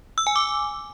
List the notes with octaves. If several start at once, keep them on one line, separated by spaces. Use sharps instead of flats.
E6
G#5
D6